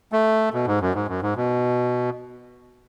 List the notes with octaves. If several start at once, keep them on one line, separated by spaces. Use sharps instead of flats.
A3
B2
G#2
F#2
G#2
F#2
G#2
B2